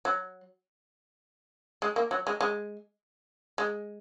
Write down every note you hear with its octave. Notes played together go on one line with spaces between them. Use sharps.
F#3
G#3
A#3
F#3
G#3
G#3
G#3